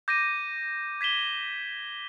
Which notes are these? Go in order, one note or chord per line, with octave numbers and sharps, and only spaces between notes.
D6 G6 A#6 D#7
G#6 B6 E7 G7